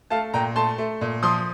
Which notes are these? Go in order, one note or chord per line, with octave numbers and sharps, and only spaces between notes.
A3 F5 A5
A#2 G5 A#5
A3 A5 C6
A3
A#2
F3 C6 D#6